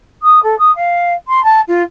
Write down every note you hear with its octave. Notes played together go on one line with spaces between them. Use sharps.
D#6
A4
D#6
F5
C6
A5
F4